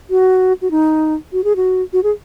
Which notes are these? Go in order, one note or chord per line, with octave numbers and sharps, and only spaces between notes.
F#4
F#4
D#4
F#4
G#4
F#4
F#4
G#4